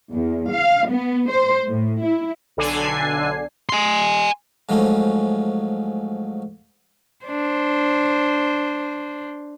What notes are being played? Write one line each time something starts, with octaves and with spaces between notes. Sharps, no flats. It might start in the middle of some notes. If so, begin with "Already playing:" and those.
E2
F5
B3
C5
A2
E4
B1 D3 D4 G#5 C7
G#5 C6
G#2 F3 F#3 A3 C#4
D4 C5